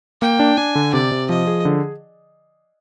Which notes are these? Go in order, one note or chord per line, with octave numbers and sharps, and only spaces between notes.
A#3 G5
D4
D4 G#5
D3
C3 D5
C3
F3 D#5
G#4
D3